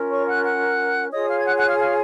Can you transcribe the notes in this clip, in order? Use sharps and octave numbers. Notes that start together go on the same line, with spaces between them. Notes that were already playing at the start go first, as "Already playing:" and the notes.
Already playing: C#4 F4 A#4
C#5 C#6
F#5 F#6
F#5 F#6
F4 G#4 C#5 D#5 D#6
F5 F6
G#6
F#5 F#6
F#5 F#6
F5 F6
F5 F6